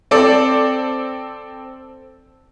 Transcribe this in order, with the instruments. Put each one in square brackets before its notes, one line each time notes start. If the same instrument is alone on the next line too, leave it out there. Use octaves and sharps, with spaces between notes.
[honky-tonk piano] C4 A4 D5